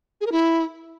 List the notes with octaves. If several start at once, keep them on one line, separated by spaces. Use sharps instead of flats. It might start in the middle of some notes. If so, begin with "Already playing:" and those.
G#4
A#4
E4